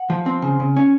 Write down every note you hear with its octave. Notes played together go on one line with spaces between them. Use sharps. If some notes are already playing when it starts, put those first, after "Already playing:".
Already playing: F#5
F3
C4
C#3
C#3
C#4